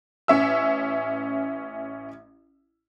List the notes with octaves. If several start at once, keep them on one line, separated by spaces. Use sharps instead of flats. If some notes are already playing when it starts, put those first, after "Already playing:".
A1 C#4 E5 E6